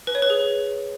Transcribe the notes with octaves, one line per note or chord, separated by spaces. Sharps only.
B4
C#5
B4
G#4